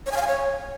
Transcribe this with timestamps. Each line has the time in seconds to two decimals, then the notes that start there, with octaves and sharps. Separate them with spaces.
0.06 C#5
0.11 G#5
0.17 F5
0.22 G#5
0.27 C#5